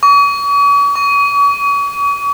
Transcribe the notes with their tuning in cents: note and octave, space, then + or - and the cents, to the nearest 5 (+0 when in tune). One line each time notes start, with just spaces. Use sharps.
C#6 +45
C#6 +40